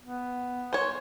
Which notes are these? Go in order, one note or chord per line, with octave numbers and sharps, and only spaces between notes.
B3
C5 C#5